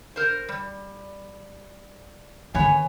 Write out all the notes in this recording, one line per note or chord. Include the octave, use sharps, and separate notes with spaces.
A#4 C5
G3
D3 D#3 B3 C#5 G#5